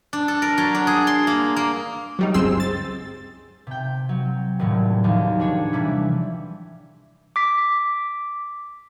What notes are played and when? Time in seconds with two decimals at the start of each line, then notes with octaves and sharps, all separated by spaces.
0.13 D4
0.28 A4
0.42 A#4
0.58 F#3
0.75 D4
0.87 G#4
1.07 C6
1.27 A#3
1.56 A#3
2.19 F#3 G3 D#4
2.34 G1 C#2 C4 G#4 C6 E6
2.60 A6
3.67 C3 G5
4.09 F#3
4.59 D#1 A2 F#3
5.04 D#2 F3
5.40 D4 G#4 C#5
5.73 C3 E3 G3 E4
7.36 D6 B6